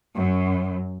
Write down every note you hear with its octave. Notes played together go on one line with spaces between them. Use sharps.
F#2